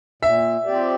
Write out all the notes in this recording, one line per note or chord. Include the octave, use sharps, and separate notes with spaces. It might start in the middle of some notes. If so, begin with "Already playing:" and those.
A#2 E5
F3 C4 G4 D5